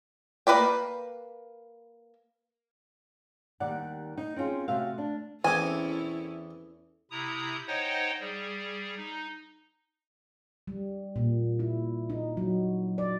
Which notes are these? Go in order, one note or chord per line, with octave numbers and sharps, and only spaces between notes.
A#3 G#4 B4 D5 G5
D#2 D#3 G3 D5 F#5
D#4
C4 C#4 F4 G#4
C3 A3 F#4 E5 F5
D4
E2 C4 C#4 E4 A4 G#5 D6
C3 E4 A#5 D#6
D#4 C5 C#5 D#5 F#5 G5
G3 G#4
D#4
G3
A#2
E4
D#4
F#3
D5